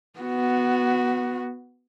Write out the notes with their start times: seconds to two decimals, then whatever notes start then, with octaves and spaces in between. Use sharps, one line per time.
0.19 B3 F#4